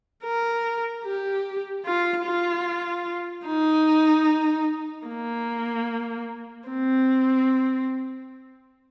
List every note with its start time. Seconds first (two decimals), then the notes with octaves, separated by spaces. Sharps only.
0.24 A#4
1.05 G4
1.86 F4
2.26 F4
3.47 D#4
5.08 A#3
6.69 C4